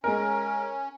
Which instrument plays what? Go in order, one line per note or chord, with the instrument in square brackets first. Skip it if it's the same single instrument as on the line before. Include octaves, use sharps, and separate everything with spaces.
[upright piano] G#3 A#4 [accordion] C#4